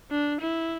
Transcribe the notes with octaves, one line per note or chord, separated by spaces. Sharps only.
D4
E4